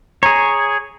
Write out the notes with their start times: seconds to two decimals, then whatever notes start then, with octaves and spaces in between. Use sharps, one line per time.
0.23 G#4 C#5 A#5